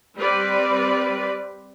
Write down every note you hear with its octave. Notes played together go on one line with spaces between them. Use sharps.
G3 C4 B4 D5